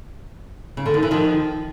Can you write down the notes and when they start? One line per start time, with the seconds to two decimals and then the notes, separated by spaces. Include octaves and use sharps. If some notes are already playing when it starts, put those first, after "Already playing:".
0.77 C#3
0.86 D3
0.94 D#3
1.03 E3
1.11 D#3 F3